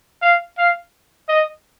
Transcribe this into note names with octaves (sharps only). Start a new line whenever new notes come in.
F5
F5
D#5